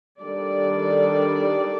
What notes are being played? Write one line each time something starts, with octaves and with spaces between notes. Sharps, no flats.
D#3 G3 D4 A4 D5